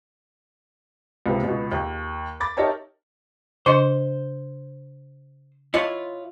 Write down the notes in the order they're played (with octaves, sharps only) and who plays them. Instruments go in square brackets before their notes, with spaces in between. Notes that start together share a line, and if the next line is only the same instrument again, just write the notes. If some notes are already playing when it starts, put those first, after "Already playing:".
[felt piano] C#2 C3 B3
C#2 B2
D#2
B5 D6 A6
D#4 G4 A#4 C#5 E5 A5
[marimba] C#3 D4 D#5 [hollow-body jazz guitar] C5
[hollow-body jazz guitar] E4 F4 C#5 [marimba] D#5